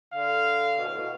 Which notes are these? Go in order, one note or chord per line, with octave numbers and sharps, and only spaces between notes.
D3 F5
B2
A2
B2